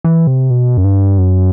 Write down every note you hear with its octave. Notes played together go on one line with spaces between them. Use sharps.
E3
C3
B2
F#2
G2
F#2